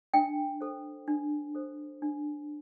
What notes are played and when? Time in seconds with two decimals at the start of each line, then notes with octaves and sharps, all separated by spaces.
0.14 D4 G5
0.61 A4 C5
1.07 D4
1.55 A4 C5
2.02 D4